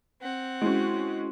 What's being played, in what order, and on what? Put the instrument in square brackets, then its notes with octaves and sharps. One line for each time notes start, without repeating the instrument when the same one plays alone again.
[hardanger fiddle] C4 F#5
[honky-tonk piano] G#3 C#4 [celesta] E4 F#4